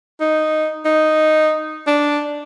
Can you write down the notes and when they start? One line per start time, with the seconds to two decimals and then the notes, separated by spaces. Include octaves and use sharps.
0.21 D#4
0.85 D#4
1.87 D4